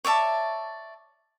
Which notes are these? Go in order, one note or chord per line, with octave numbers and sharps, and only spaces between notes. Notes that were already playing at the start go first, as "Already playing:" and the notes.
C#5 D5 E5 A5